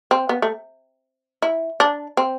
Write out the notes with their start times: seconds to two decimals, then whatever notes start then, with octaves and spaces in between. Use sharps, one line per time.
0.11 C4
0.29 B3
0.42 A3
1.42 E4
1.80 D4
2.17 C4